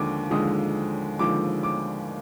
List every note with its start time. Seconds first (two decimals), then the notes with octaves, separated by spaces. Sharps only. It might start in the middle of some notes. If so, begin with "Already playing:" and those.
Already playing: D#2 D3 F3 G#3 D6
0.31 D#2 D3 F3 G#3 D#6
1.19 D#2 D3 F3 G#3 D6
1.63 D6